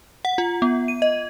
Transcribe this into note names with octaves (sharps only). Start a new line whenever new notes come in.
F#5
F4
B3
D#7
D#5